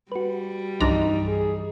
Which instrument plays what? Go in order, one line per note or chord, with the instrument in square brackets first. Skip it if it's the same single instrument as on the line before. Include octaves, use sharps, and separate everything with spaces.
[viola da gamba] G3 [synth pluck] F#4 B4
[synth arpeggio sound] C2 D4 A#5 [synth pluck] G2 E3 F3 [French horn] D#4
[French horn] G#4